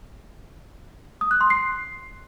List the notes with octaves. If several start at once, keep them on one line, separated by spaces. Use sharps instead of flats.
D#6
F#6
C6
C7